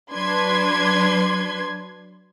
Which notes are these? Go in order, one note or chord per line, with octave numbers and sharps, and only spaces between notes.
F#3 D4 B4 C6 G#6